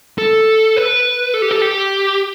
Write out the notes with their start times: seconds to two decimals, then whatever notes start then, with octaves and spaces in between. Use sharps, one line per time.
0.18 A4
0.76 B4
1.34 A4
1.42 G4
1.51 A4
1.62 G4